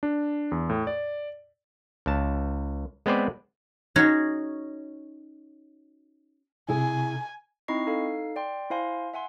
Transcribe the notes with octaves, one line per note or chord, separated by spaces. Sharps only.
D4
E2
A2
D5
C#2 A5
G#3 B3 C4 B4 C5 D5
C#4 D#4 F#4 G#4 C#5
C3 E4 G#4 G#5
C4 D#4 E4 D#5 C#6 C7
D#4 A4 F5 C7
D5 G5 C6
E4 C5 F5 G#5 C6
E5 F#5 G#5 C6